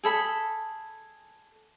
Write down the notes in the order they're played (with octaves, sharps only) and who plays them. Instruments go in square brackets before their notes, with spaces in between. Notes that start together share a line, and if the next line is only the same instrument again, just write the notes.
[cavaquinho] G#4 A4 B5